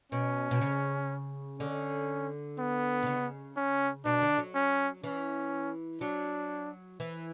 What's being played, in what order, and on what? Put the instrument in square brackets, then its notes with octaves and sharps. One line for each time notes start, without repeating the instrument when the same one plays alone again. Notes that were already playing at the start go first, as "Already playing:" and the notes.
[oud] B2 [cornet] C#4
[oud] B2
C#3
[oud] D3 [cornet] C#4
[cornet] B3
[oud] B2
C#3
[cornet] C#4
[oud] B2 [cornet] D4
[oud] D3
F#3
[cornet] C#4
[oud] E3 [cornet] C#4
[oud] F#3 [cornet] D4
[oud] E3